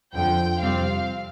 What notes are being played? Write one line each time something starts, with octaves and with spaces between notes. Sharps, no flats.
F2 D3 F3 G5
F2 C3 G3 C4 F5